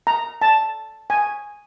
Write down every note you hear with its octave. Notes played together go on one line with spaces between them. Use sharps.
A#5
A5
G#5